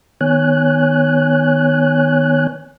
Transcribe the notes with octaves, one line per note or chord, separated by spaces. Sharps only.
D#3 B3 C#5 G#5 F#6